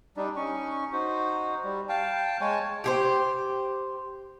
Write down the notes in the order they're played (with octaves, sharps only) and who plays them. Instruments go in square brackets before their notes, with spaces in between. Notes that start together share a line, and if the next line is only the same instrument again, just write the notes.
[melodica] G3 D4 D#4
C#4 D#4 C#6
D#4 F#4 C5
G3
F5 G5 A5
G#3 C#5 G#5 A5
[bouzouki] G4 G#4 C5